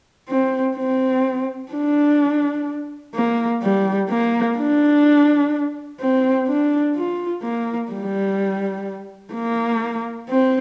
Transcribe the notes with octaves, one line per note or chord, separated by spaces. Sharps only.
C4
C4
D4
A#3
G3
A#3
D4
C4
D4
F4
A#3
G3
A#3
C4